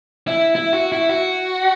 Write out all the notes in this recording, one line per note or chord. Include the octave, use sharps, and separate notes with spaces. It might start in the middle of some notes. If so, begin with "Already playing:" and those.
E4
E4
F#4
E4
F#4